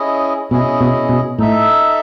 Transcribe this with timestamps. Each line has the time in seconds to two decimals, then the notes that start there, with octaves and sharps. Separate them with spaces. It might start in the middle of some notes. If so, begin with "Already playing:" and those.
Already playing: C#4 E4 G#4 D#5
0.51 B2 C#4 E4 G#4 D#5
0.81 B2
1.09 B2
1.38 A2 D#4 A4 E5